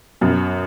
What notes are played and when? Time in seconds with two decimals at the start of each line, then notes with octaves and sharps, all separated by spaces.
0.21 F#2 B2